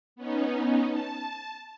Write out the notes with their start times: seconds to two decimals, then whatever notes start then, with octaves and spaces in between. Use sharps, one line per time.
0.16 B3 C#4 D#4
0.89 A5